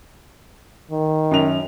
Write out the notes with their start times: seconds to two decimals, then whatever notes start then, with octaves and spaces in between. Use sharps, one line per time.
0.91 D#3
1.31 F#2 F7